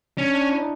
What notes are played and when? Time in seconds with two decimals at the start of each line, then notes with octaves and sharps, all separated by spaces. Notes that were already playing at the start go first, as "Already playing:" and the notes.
0.17 C#4 D4
0.34 D4
0.51 E4
0.59 D#4